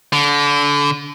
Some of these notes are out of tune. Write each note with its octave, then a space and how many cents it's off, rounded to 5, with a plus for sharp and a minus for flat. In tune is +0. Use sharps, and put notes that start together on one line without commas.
D3 -30